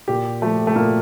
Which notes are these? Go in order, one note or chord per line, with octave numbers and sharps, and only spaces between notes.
A#2 G4
F3 A3
A3
A#2 A#3